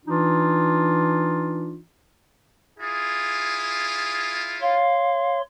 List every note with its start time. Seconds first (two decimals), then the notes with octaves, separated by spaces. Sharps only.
0.06 E3 D4 D#4 F4
2.79 E4 F4 G#4
4.61 C#5 F5 C6